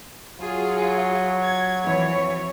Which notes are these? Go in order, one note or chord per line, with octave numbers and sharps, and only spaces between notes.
F#3 F4 G#4
G#6
F2 E3 C#5